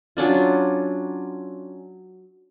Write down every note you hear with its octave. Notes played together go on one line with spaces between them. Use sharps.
F#3 C#4 D4 F4